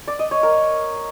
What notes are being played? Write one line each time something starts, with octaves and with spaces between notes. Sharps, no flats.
D5
D#5
C#5
A#4